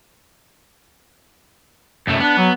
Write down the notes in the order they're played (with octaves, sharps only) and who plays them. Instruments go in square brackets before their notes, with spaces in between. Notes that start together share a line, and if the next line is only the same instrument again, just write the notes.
[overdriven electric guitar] F#2 A3
[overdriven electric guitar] B3 [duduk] D4
[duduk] F#3